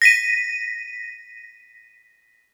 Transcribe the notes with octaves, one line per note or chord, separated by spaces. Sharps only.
A#6 B6 D#7